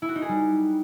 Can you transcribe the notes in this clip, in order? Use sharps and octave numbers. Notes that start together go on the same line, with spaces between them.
E4
F#4
D#4
G#4
G3